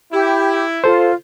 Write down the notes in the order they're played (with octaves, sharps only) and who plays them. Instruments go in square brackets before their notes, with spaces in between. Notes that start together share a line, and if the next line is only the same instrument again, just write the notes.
[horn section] E4 [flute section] G4
[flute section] F4 [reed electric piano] A4 C5